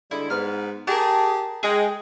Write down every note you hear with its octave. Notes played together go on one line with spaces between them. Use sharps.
D3 G3 G#3 E4
G#2 B3 F6
G4 G#4 A#4 A5
G#3 G#4 G5